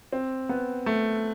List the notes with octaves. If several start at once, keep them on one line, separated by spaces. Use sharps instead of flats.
C4
B3
A3